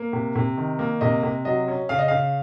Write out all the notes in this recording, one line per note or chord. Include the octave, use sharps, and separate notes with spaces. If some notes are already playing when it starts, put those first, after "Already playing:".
Already playing: A#3
C3
C3
D#3
A#3
C3 D#5
C3
F#3 D#5
C#4
C#3 F5
D#5
C#3 F5